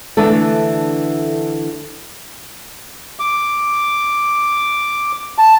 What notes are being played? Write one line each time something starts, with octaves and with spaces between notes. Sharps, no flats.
D3 E3 A3 D4 A4
D6
A5